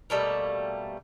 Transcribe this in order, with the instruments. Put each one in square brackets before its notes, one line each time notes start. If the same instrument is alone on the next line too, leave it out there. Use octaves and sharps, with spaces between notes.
[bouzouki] B2 G3 A3 A#3